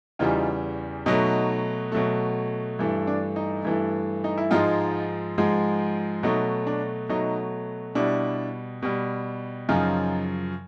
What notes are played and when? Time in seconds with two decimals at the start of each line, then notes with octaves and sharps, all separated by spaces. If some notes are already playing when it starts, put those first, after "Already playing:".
0.19 E2 C#3 E3 G3 D#4 F4
1.06 B2 F#3 A3 D#4
1.92 B2 F#3 A3
2.79 G2 E3 A3
3.07 D4
3.36 D#4
3.65 G2 E3 A3
4.24 D#4
4.38 E4
4.51 G#2 F3 G#3 D#4 F4
5.38 G#2 F3 G#3
6.23 B2 F#3 A3 D#4
6.67 D4
7.09 B2 F#3 A3 D#4
7.95 B2 G3 D4 E4
8.82 B2 G3
9.69 F#2 C#3 F3 D#4 F4